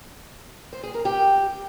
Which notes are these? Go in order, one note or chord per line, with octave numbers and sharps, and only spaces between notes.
C5
G#4
A#4
G4